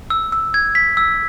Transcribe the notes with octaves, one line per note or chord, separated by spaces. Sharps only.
E6
E6
G#6
B6
E6